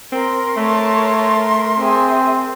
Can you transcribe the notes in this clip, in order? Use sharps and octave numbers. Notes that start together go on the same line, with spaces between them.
C4 A#4 C6
A3 C#5 A5
C4 G#4 E5